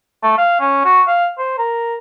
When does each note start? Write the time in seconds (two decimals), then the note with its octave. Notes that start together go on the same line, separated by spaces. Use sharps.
0.23 A3
0.38 F5
0.60 C#4
0.85 F#4
1.07 F5
1.38 C5
1.58 A#4